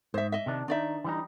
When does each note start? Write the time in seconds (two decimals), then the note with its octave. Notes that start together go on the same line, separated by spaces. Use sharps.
0.14 G#2 C5 E5
0.32 D#5 E5
0.46 C3 D#3 D4
0.68 D#3 D4 D#4 D5 E5
1.04 E3 G3 D#4